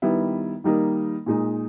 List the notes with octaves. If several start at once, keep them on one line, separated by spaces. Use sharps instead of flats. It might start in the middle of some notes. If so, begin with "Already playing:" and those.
D#3 G3 B3 E4
D#3 G3 A#3 D#4
A#2 G#3 D#4